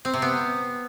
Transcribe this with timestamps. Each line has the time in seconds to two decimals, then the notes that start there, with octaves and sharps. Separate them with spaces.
0.05 C4
0.14 C3
0.22 B3